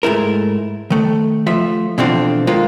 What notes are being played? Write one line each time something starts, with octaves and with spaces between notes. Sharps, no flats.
G#2 A3 E4 A#4
D#3 A3
F3 A3 E5
B2 D3 E3 F3 C4 D4
D#3 F3 G#3 A#3 F4